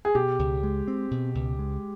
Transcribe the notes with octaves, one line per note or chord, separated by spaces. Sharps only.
G#4
B2 G4
C#2
G#3
C4
B2
C#2
G#3